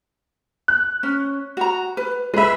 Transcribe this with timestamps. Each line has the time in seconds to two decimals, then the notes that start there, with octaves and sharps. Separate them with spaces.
0.68 F#6
1.03 C#4
1.57 F#4 A#5
1.97 B4
2.34 G#3 B4 E5 B5